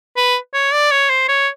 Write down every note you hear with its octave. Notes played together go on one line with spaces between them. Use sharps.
B4
C#5
D5
C#5
C5
C#5